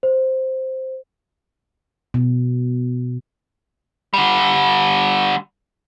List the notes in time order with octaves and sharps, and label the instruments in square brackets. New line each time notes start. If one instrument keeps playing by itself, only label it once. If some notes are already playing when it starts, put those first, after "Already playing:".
[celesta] C5
[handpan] B2
[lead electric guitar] D3 G3